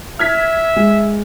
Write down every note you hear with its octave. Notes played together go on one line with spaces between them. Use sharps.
E5 F6 G#6 B6
G#3